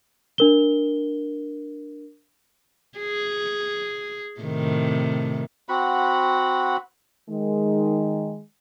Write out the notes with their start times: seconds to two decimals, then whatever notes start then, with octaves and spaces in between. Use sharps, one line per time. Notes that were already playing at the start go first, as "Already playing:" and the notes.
0.38 D4 A#4 G7
2.98 G#4
4.40 A2 C3 D#3
5.69 C4 F#4 F#5 B5
7.30 D#3 G#3